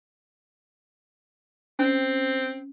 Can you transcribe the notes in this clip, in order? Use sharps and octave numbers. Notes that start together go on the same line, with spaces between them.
C4 C#4